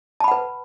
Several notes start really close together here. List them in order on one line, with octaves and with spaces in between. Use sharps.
A5 B5 F#5 B4